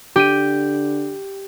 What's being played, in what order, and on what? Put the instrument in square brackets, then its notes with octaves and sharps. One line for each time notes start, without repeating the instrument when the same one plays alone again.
[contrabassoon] D3 [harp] G4 D#7